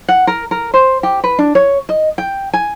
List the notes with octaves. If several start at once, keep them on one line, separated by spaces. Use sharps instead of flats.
F#5
A#4
A#4
C5
G4
B4
D4
C#5
D#5
G5
G#5